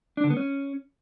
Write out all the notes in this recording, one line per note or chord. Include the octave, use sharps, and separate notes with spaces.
D4
D3
B3
C#4